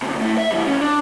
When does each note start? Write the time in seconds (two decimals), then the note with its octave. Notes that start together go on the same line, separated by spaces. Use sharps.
0.02 D2 C3
0.21 A3 E4
0.38 E5
0.52 E3 G3
0.66 C2 C#4
0.81 D4